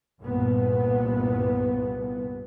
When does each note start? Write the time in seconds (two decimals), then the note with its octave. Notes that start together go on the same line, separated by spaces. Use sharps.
0.20 C2 G2 A#2 B3